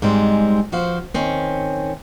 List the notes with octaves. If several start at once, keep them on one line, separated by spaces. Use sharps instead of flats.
G#2 G3 G#3 C4
F3 F#4 C5 F5
D#3 C4 C#4